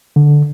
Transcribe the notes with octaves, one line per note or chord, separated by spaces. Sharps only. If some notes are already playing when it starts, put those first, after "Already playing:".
D3